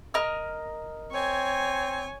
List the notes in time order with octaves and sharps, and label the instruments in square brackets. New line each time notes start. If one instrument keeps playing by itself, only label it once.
[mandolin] A#4 D#5 F6
[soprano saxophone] C4 [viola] C#5 G#5